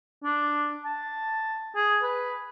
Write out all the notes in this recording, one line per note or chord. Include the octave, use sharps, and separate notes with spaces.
D4
A5
G#4
B4